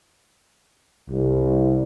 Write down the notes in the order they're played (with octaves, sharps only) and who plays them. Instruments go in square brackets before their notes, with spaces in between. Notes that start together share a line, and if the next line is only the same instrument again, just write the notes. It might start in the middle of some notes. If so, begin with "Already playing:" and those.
[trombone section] C2